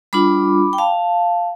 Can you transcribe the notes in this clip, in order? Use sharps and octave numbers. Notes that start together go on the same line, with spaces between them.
G3 D4 F4 B5 D6
G5
F5 A5